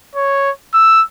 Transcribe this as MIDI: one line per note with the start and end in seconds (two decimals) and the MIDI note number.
0.16 0.51 73
0.74 1.03 88